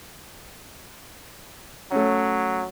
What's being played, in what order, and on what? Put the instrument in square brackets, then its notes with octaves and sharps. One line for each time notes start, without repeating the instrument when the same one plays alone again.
[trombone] F#3 [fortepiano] A3 C#4